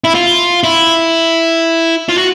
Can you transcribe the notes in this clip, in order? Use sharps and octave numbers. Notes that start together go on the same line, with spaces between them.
E4
F4
E4
F4
F#4